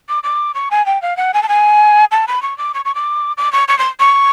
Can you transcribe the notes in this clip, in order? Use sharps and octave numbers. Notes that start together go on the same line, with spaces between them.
D6
D6
C#6
G#5
G5
F5
F#5
G#5
A5
G#5
A5
B5
C#6
D6
C#6
C#6
D6
D6
C#6
C#6
C6
C#6